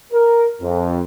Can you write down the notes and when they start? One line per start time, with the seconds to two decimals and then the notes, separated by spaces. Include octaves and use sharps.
0.13 A#4
0.61 F2